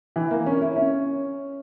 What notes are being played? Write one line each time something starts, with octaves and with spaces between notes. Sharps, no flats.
E3
A#3
C#4
E4
C#4